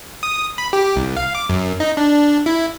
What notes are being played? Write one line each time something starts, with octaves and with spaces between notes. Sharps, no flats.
D#6
B5
G4
C2
F5
D6
F#2
D#4
D4
E4